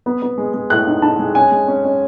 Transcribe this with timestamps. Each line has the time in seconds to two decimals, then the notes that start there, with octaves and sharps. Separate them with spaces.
0.06 B3
0.22 B3
0.38 G#3
0.54 G#3
0.70 A2 F#6
0.87 D#4
1.02 D#4 A5
1.19 G#3
1.35 C#4 G#5
1.52 G#3
1.68 C#4
1.85 C#4